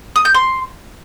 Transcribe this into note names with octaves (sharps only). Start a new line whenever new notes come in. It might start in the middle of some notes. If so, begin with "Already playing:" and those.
D#6
G6
C6